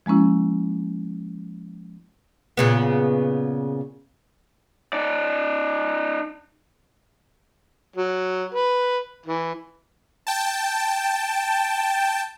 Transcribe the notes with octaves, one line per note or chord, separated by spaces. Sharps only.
F3 G#3 A#3 C#4 E4
A#2 C#3 B3
D#4 D5
F#3
B4
E3
G5 A5